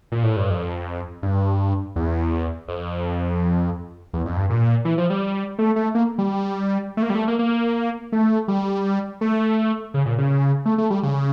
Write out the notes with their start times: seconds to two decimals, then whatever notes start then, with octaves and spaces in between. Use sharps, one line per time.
0.12 A#2
0.23 A2
0.36 G2
0.50 F2
1.23 G2
1.96 E2
2.68 F2
4.13 E2
4.25 F2
4.37 G2
4.50 A#2
4.85 E3
4.98 F3
5.10 G3
5.59 A3
5.76 A3
5.95 A#3
6.18 G3
6.97 A3
7.03 A#3
7.10 G3
7.15 A3
7.28 A#3
7.39 A#3
8.12 A3
8.48 G3
9.21 A3
9.94 C#3
10.06 A#2
10.18 C#3
10.66 A3
10.78 A3
10.90 G3
11.03 C#3